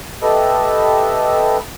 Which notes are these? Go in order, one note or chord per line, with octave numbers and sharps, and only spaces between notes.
G4 A4 B4 D#5 E5